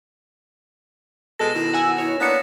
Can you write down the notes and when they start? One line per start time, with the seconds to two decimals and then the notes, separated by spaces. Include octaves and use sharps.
1.39 B2 G#3 A4 A#6 E7
1.54 B2 D#3 E4
1.74 F#5 G#5 E6
1.98 E4 C#5
2.20 A#3 B3 D4 C#5 B6 C#7